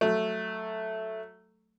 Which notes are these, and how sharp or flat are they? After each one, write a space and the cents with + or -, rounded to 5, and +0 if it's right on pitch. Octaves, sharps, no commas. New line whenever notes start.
F#3 +0 A3 +0